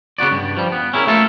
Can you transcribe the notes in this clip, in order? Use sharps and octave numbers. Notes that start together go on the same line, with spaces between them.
C#3 B3 F#4 D5
G2
F3 G3
B3
C#4 E4 G#4 A#4
A3 A#3 F4 A4 A#4 E5